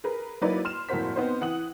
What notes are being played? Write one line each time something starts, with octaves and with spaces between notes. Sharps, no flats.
G#4 A#4 B4
F#3 A#3 D#4 E4 B4 D5
C6 F6 E7
F1 A2 A#3 F#4 C5 B6
B3 C4 D#4 C5
E3 F#5 D#6 F#7